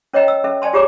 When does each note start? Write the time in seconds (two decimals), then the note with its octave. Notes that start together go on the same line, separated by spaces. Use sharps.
0.13 C#4 C#5 D#5 G5 A#5
0.28 E6
0.44 C#4 A4 E5
0.62 D5 G#5 A5 C6
0.73 F4 G4 G#4 C#5 A#5 D6